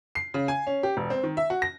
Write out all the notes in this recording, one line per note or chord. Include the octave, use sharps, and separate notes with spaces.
C7
C#3
G#5
C#4
G4
E1
C4
D#3
E5
F#4
A#6